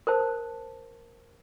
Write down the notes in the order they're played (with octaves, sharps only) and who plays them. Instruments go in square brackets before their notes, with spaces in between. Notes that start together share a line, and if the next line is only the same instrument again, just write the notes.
[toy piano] A#4 C5 A5